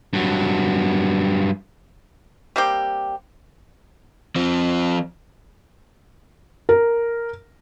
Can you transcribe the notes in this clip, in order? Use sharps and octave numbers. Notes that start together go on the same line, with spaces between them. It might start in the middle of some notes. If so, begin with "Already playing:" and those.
G2 F#3
G3 A#3 C4 G4
F3 C4
A#4